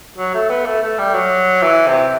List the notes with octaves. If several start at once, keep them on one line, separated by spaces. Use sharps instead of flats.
F#3
A3
B3
A3
A3
G3
F#3
E3
C3